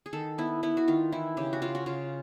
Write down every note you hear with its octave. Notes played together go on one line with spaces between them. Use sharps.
G#4
D#3 A4
B3 E4
B3 E4
F#4
D#3 F4
E3 E4
C#3 G4
F#4
C#3 F4
F#4
C#3 F4